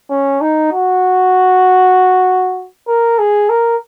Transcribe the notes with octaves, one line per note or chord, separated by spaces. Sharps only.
C#4
D#4
F#4
A#4
G#4
A#4